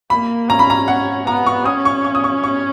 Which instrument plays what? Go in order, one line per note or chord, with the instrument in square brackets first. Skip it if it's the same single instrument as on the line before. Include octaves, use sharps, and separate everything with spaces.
[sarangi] A#3 [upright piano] B5
[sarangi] C#4 [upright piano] A#5
[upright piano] B5
A#5
[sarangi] C#4 [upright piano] F#5
[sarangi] B3 [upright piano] A#5
[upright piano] C#6
[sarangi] C#4 [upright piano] D#6
[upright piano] C#6
C#6
D#6
C#6
C#6